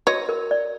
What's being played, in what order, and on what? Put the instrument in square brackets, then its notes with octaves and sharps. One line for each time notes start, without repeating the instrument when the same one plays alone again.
[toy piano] F#4 [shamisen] C#5 D#5
[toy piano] A#4
D5